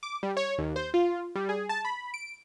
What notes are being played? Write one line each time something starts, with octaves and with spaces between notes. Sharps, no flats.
D6
G3
C#5
D#2
C5
F4
G3
G#4
A5
B5
D7